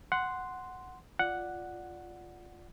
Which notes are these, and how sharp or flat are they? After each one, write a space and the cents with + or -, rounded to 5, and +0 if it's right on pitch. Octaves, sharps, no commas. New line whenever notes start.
F#5 +0 C6 -5
F4 +0 D5 +0 F#5 +0